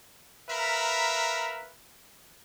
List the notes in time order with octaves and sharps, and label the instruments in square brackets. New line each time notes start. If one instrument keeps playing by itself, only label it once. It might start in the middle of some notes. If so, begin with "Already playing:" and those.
[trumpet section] A#4 B4 E5 F5 A#5 B5